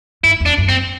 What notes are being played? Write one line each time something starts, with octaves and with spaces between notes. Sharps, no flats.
G2 E4
E2
D4
F#2
C4